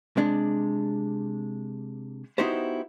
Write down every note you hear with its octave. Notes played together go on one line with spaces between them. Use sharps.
C3 G#3 D4
B3 D#4 E4 F#4 G4 C5